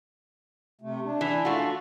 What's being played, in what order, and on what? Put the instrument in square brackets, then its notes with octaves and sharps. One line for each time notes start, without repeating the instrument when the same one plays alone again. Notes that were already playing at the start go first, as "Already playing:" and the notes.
[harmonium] C3 A3
D4
[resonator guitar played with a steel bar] E3
A3 F4 F#4